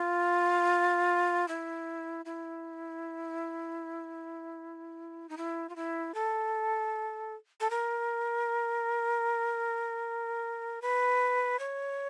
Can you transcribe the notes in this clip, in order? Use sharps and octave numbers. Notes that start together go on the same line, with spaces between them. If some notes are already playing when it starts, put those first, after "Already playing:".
Already playing: F4
E4
E4
D#4
E4
F4
E4
A4
A4
A#4
B4
C#5